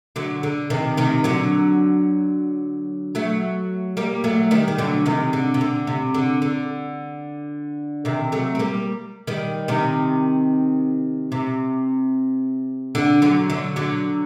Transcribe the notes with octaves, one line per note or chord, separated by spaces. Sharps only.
D3 F#3
D3
C3 D#3
C3 D#3
D3 F#3
F#3 A3
G3 A#3
F#3 A3
D#3 G3
D#3
D3 F#3
C3 D#3
D3
C3
D3
C3
D3
D3
C3 D#3
F#3 A3
C4
G3 A#3
D#3 G3
C3 D#3
C3
D3
D3 F#3
D3 F#3
D3 F#3